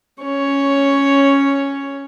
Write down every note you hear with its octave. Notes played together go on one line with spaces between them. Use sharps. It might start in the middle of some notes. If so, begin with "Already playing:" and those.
C#4 C#5